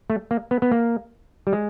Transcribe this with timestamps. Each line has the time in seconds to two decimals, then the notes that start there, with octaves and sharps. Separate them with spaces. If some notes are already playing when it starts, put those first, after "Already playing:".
0.10 A3
0.31 A#3
0.51 B3
0.62 B3
0.71 A#3
1.47 G3
1.53 G#3